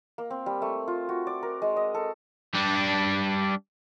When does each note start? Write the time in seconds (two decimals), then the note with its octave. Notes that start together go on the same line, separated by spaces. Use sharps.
0.18 A#3
0.30 C4
0.46 G3
0.62 A3
0.88 F4
1.09 F#4
1.27 D5
1.43 A#4
1.62 G#3
1.76 D#5
1.94 A4
2.54 G3 D4